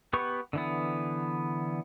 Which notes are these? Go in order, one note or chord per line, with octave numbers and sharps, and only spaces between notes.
B3 G4 B4 F#5 C#6
D3 E3 B3